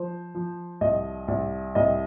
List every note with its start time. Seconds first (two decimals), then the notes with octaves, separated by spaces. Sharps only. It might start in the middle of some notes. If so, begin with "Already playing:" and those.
Already playing: F3 C5
0.35 F3
0.81 C2 D#5
1.28 C2
1.75 C2 D#5